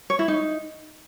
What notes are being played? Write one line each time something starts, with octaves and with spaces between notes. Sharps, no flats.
C#5
E4
D#4